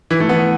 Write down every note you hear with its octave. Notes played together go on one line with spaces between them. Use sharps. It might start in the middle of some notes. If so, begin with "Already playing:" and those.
E3
A3
B3